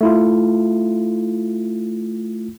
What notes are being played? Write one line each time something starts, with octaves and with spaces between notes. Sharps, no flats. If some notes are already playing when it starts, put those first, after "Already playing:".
A3 E4 F4